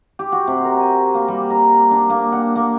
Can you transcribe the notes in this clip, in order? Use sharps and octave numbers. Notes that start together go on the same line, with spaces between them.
G4
F#4
C3
A#4
G#5
A#3
G3
A#5
D4
A#3
F#5
A#3